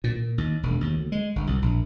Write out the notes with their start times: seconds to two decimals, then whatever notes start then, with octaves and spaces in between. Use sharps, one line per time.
0.04 A#2
0.16 A#2
0.38 D#2
0.63 E1
0.81 D#2
0.95 D2
1.12 G#3
1.36 G1
1.47 C2
1.62 A#1